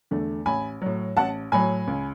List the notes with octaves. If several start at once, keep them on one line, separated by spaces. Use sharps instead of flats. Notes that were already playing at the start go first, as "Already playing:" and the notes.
E2 D3 A3
A1 G#5 B5
A2 F#3
A1 F#5 A5
A2 F#3 G#5 B5
C#2